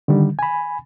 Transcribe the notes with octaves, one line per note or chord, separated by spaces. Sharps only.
D3 D#3 G3
G#5 B5